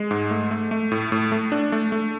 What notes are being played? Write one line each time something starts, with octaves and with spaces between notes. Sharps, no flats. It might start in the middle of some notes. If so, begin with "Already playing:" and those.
Already playing: G#3
G#2
A3
A3
A3
A2
A2
A3
D4
A3
A3